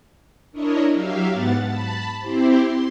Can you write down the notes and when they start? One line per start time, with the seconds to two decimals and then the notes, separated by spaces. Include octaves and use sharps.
0.52 D4 E4 A#4 C#5 D#5
0.90 F#3 G4 E5 F5
1.32 G#2 B3 F#5 A6
1.61 A5 B5
2.20 C4 E4 G4 C5
2.59 C6